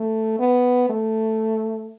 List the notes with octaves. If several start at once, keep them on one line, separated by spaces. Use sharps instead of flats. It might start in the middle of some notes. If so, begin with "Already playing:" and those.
Already playing: A3
B3
A3